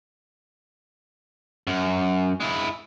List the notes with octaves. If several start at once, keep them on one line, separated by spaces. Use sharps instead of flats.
F#2
G#3 E4